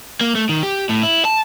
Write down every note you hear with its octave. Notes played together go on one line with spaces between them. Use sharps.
A#3
A3
D#3
G4
A2
E4
A5